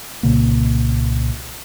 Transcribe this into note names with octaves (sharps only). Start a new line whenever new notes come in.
C2 A#2 C#3 A#3